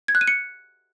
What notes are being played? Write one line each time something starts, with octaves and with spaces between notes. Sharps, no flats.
G#6
F#6
D#7
C#7